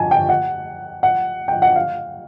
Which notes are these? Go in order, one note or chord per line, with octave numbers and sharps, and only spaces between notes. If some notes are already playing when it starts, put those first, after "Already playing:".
Already playing: G#5 A5
G5
F#5
F#5
G5
F#5
F5